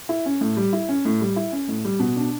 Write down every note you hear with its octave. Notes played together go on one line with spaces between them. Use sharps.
E4
C#4
A2
G3
E4
C#4
A2
G3
E4
C#4
A2
G3
B2
D4